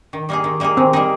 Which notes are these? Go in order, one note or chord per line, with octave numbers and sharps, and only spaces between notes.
D#3
G3 A#3 D#4 G#4
D#3
G3 A#3 D#4 G#4
D#3 C4
G3 A#3 D#4 G#4